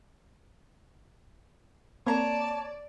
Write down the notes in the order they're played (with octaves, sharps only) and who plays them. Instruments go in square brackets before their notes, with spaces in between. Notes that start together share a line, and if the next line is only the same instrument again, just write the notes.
[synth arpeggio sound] A#3 C4 [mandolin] C#5 A#5 [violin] D5 [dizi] A5